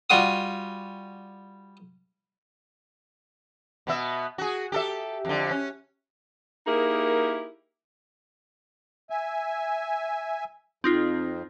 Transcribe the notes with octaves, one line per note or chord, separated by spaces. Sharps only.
G3 F4 F#4 D#6
B2 B3 E5
F#4 G#4
G4 A4 E5
F2 D3
C#4
A#3 D#4 E4 G4 G#4 A#4
E5 G#5
F2 C4 D#4 F4